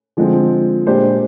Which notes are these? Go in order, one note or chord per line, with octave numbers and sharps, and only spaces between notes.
D3 F3 G#3 C4
A#2 G#3 D4 G4 C5